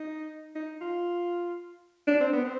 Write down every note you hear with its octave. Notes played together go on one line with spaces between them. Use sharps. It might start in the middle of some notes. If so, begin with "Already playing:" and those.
Already playing: D#4
D#4
F4
D4
C4
B3
C4